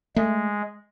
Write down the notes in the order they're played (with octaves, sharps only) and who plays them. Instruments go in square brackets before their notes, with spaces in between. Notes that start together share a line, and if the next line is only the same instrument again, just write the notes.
[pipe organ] G#3 [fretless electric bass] A3